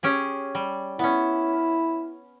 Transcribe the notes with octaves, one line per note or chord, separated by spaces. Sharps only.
C#4 G4 G#4
G3
B3 C#4 E4